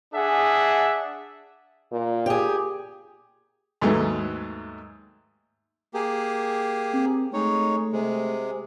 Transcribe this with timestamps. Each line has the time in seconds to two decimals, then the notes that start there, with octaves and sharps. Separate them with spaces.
0.13 D4 G#4 E5 F#5
1.92 A#2
2.26 G4 G#4
3.81 D#2 G#2 F#3 G#3 A3 B4
5.94 A#3 G4 G#4
6.94 C4
7.33 G#3 A3 D#4 C#5
7.93 C3 G#3